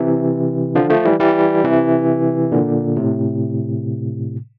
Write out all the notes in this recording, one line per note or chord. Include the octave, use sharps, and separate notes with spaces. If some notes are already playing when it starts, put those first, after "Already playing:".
Already playing: C3 E3
D3 F3
F3 A3
E3 G3
E3 G3
C3 E3
A#2 D3
A2 C3